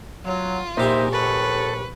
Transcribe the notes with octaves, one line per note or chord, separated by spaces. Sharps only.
F#3 F4
A#1 A#3 D#4 G4 C5 E5 G#5
D#2 A4 B4 C#6